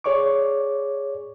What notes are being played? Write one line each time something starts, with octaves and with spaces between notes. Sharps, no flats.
G#4 C#5 D5 C#6 D6